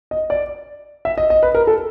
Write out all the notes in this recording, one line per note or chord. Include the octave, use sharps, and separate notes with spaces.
D#5
D5
E5
D#5
D#5
B4
A#4
A4